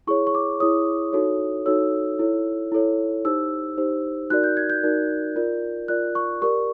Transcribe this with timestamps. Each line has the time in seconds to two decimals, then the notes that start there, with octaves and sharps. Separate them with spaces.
0.07 E4 G#4 C#5 C#6
0.27 C#6
0.35 D6
0.60 E4 G#4 C#5 D#6
1.13 D#4 F#4 A4 C#5
1.66 D#4 F#4 A4 C#5 E6
2.19 E4 A4 C#5
2.72 E4 A4 C#5
3.25 D#4 G4 C5 E6
3.78 D#4 G4 C5
4.30 D#4 F#4 A#4 D5 F#6
4.44 G6
4.57 G#6
4.70 G6
4.83 D#4 F#4 A#4 D5
5.36 F4 A#4 D5
5.88 F4 A#4 D5 F#6
6.15 C#6
6.41 G4 A#4 D5 C#6